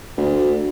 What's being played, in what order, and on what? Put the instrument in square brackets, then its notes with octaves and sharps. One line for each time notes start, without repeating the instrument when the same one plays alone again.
[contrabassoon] D2